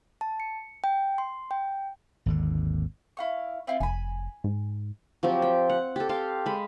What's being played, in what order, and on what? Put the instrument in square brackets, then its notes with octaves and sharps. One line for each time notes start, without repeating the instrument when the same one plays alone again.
[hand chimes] A5
C#7
G5
C6
G5
[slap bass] G#1 D#2 D3
[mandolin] E4 F5 C#6
C4 E4 F4
[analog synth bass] F1 [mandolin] G#5 B5
[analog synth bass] G#2
[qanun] F3 F#3 C4 G4
G5
F#5
G4 A4
G4 F5 C6
G#3 B5